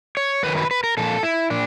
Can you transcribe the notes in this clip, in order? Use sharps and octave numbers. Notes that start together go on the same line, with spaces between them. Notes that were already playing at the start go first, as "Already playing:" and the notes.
C#5
F#2 D#3 F#3 B4
B4
B4
A#4
A#2 F3 A4
E4
A#2 D4